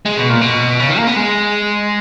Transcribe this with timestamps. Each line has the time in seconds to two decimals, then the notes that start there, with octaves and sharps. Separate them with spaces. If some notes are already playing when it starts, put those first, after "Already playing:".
0.06 G#3
0.17 B2
0.29 A#2
0.41 B2
0.79 C#3
0.89 D#3
0.98 A#3
1.07 B3
1.16 G#3